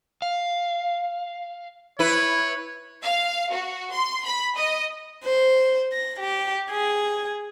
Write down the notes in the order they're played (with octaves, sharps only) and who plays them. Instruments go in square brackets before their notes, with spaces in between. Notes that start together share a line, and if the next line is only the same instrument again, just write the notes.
[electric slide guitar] F5
[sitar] E4 B4 [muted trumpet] C#5
[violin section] F5
F#4
C6
B5
D#5
[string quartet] C5
A#6
G4
G#4